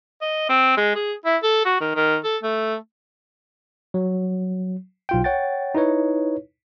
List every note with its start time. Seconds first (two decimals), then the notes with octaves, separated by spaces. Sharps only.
0.21 D#5
0.49 C4
0.77 G#3
0.95 G#4
1.25 E4
1.43 A4
1.65 F#4
1.81 D#3
1.95 D#3
2.24 A4
2.43 A3
3.94 F#3
5.09 B1 F4 G5
5.24 C#5 F#5 G5 A6
5.75 D#4 E4 B4 C#5